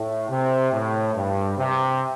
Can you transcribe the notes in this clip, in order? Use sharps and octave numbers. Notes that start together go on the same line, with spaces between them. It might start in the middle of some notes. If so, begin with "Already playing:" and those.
Already playing: A2
C3
A2
G2
C3